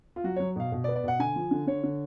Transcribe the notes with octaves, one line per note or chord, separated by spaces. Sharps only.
F4
F#3 F#4
F#3 C#5
B2 F5
B2
D5
B3
D5
B2 F#5
D3 G#5
F3
D3
D3 C#5
D3